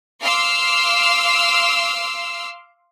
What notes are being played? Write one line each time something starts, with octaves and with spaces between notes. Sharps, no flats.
F5 C6 D6 E6 F6